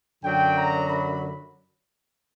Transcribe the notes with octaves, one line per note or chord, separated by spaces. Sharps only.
F#2 D3 F#3 G5
A#5
B5